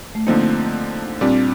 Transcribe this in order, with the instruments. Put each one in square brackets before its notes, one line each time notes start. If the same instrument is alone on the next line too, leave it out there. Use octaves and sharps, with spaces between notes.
[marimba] A3
[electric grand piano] D3 F3 C4 D#4 [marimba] A#3
[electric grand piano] A#2 G3 D4 [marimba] C4